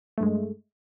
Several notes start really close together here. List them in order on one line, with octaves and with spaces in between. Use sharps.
A3 G2 G#3